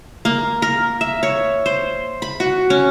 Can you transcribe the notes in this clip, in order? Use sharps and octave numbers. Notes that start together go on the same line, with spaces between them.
A#3
A#4
E5
C#5
C5
B5
F#4
C#4